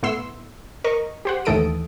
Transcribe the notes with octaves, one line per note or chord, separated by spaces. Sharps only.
A2 B3 E4 C6 E6
A#4 D#5 C#6
G4 C5 F#5
D#2 A2 E3 A4 D#6 D7